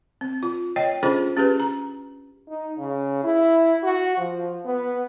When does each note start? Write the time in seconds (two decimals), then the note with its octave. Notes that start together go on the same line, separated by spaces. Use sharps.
0.21 C4
0.43 F4
0.76 C#5 D#5 G5
1.03 C#4 D4 F4 G#4 A4 C5
1.36 C#4 G4 G#4 B4
1.60 A#5
2.49 D#4
2.78 C#3
3.24 E4
3.83 F#4
4.18 F3
4.65 B3